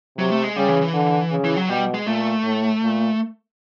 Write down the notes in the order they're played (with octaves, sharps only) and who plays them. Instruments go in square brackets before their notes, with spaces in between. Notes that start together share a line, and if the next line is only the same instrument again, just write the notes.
[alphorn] C3 [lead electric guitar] F#3
[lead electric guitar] A3
G#3
[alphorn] C#3 [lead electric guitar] G3
[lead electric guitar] E3
E3
[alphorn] D3
C#3
[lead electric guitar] E3
F#3
[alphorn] B2 [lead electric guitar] G3
[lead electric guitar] G#3
[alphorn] A#2 [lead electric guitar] A3
[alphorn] A2
A#2